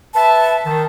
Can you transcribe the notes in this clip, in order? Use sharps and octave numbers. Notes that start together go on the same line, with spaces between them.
B4 E5 A5
D#3 A5